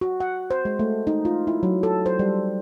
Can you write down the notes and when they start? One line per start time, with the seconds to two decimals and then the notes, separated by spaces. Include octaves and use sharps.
0.01 F#4
0.20 F#5
0.51 C5
0.65 G#3
0.79 A3
1.07 D#4
1.25 F4
1.47 E4
1.63 F#3
1.83 A4
2.06 C5
2.19 G3